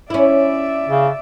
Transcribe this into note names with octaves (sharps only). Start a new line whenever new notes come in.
C#4 E4 D5 E5
C#3